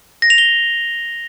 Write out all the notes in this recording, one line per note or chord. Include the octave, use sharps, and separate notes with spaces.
A#6
F7
G7